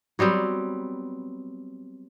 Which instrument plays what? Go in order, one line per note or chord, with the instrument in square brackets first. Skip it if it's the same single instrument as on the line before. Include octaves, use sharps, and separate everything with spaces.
[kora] F#3 G3 B3 C4